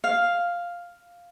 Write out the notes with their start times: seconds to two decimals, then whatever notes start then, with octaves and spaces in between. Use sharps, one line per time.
0.04 F5